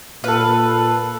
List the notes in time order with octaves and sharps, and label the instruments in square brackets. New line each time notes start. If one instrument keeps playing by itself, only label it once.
[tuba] A#2 [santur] A4 F5 [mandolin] B4